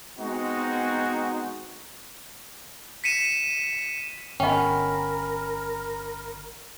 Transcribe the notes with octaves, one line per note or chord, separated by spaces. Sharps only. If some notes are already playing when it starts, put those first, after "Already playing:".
G#3 B3 C4 D#4 F#4
B6 C#7 D#7 E7
G1 C#4 A#4 D#5 F#5 G5 B5